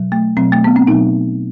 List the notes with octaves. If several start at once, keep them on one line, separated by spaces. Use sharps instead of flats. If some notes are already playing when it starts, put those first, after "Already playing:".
Already playing: B2 F#3
A3
B2 F#3 C4
A3
B3
C4
B2 F#3 D#4